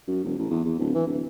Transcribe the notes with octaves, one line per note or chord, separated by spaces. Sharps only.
F#2
E1
A1
E2
E2
D1
E3
D1